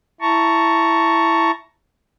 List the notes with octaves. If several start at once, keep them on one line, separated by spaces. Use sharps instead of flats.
E4 A5 A#5 C#6